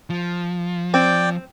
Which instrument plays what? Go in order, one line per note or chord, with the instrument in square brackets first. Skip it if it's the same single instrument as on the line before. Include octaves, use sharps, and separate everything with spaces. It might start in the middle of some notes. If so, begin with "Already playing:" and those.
[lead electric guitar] F3
[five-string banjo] C4 [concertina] D5 G5